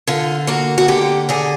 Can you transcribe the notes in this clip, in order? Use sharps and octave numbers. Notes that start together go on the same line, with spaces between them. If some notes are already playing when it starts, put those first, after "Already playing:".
D3 F4
A#3 F#4
F#4
D3 G4
D3 G#4